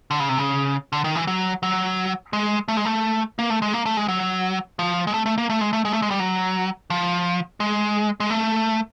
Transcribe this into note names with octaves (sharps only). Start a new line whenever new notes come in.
D3
C#3
C3
C#3
D3
D#3
E3
F#3
F#3
G#3
A3
G#3
A3
A#3
A3
G#3
A#3
A3
G#3
F#3
F3
G#3
A3
A3
A#3
A3
G#3
A3
G#3
A3
G#3
G3
F#3
F3
G#3
G#3
A3